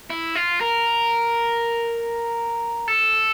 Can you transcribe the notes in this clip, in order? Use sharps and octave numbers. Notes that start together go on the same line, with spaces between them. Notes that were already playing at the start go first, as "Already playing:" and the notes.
E4
F4
A#4
A4